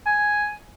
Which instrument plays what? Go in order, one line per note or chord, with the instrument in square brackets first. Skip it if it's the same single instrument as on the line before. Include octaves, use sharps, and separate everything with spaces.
[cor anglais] G#5